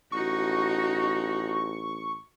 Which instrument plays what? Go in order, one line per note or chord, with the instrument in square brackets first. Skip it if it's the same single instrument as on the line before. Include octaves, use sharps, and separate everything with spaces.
[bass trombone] A1 [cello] D#4 F#4 [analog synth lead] C#6